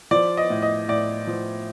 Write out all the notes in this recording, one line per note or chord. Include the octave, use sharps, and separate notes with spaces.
F3 D5
D#5
A2
D#5
A2 D5
F3